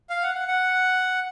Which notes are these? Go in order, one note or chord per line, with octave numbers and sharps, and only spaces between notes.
F5
F#5
F#5
F#5